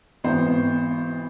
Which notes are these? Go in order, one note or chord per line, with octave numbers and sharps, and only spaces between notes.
G#1 B2 E3 B3 C5